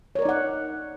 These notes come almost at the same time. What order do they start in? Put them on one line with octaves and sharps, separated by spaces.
C#5 A#4 D5 D#4 F#5